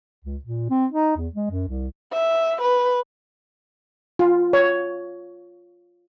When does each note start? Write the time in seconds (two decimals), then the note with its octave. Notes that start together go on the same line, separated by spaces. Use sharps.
0.24 C#2
0.44 A#2
0.70 C4
0.92 D#4
1.17 E2
1.35 G#3
1.50 F#2
1.67 C2
2.13 E5
2.62 B4
4.19 F4
4.53 C#5